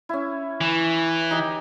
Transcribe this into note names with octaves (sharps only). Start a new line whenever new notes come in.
C#4 E4
E3
D#4 G4